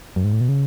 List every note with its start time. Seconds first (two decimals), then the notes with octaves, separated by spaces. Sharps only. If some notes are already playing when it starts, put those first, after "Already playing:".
0.16 F#2
0.24 G#2
0.33 A2
0.41 B2
0.49 C#3